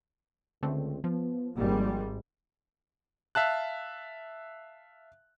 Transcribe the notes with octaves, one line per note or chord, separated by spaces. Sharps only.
C#2 D3 A3 C4
F3 B3
G#1 G#2 G3 A#3
E5 F5 A5 F#6